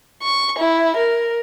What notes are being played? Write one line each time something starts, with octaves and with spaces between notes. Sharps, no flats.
C#6
E4
A#4